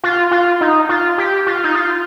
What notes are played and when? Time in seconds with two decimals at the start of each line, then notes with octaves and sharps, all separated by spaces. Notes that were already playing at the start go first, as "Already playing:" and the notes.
0.04 F4
0.31 F4
0.61 D#4
0.89 F4
1.18 G4
1.47 F4
1.64 D#4
1.75 F4